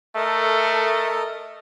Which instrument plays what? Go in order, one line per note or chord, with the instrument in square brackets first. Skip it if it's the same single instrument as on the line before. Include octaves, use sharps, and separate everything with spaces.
[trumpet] A3 [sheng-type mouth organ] A4 A#4 D#5